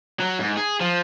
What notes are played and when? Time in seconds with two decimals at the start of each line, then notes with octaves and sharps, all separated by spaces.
0.20 F#3
0.40 G#2
0.57 G#4
0.80 F3